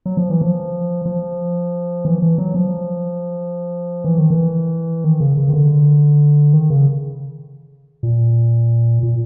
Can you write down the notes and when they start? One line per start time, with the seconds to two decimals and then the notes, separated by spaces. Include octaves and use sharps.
0.06 F#3
0.17 F3
0.30 E3
0.42 F3
1.05 F3
2.05 E3
2.22 E3
2.38 F#3
2.55 F3
4.04 E3
4.18 D#3
4.30 E3
5.04 D#3
5.20 C#3
5.37 C#3
5.49 D#3
5.54 D3
6.54 D#3
6.70 C#3
8.03 A#2
9.03 A#2